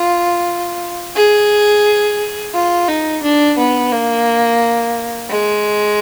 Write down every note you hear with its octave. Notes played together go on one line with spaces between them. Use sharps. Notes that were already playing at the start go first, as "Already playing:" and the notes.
Already playing: F4
G#4
F4
D#4
D4
B3
A#3
G#3